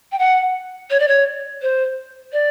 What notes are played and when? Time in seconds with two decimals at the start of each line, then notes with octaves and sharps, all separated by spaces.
0.12 G5
0.19 F#5
0.90 C#5
1.00 D5
1.08 C#5
1.62 C5
2.33 D5